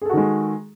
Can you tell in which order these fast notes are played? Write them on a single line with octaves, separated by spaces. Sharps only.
G#4 A4 F#4 D#3 G#3